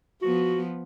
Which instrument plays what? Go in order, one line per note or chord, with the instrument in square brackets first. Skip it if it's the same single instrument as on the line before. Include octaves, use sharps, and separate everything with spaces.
[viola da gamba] F3 B3 [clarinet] F#4